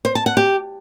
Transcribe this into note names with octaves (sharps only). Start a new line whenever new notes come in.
C5
A5
F#5
G4